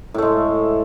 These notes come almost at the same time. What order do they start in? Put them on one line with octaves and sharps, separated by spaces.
A2 A3 G#3